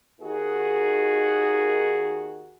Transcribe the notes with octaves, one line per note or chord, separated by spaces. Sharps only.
D#2 D#3 F#4 G#4